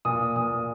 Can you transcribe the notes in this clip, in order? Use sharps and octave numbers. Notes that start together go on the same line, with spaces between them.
A#2 D#6
A#2 D#6